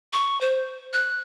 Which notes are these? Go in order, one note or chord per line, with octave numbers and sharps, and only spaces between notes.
C#6
C5
F#6